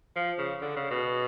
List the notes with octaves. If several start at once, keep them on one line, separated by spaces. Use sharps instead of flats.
F3
C#3
D3
C#3
B2